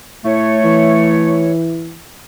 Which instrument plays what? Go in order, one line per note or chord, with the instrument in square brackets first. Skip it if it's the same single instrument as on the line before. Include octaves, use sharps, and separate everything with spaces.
[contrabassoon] A2 [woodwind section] A3 C#5
[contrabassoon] E3